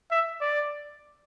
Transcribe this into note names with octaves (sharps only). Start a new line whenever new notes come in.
E5
D5